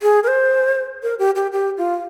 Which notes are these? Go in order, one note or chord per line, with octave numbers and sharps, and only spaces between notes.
G#4
A#4
C5
A#4
G4
G4
G4
F4